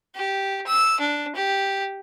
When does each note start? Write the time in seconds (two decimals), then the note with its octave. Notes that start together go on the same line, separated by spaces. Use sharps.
0.16 G4
0.67 E6
1.00 D4
1.35 G4